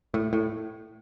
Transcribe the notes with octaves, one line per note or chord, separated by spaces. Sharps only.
A2
A2